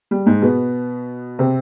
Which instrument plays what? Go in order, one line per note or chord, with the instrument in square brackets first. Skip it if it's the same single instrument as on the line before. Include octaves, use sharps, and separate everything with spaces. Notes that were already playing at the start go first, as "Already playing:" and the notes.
[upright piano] G3
G#2 G#3
B2 B3
C3 C4